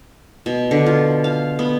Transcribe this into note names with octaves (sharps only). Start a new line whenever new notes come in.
B2
D3
F4
F5
B3